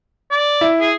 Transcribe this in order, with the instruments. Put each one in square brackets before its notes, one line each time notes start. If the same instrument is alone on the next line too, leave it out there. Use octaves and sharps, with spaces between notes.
[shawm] D5
[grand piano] E4
[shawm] G#4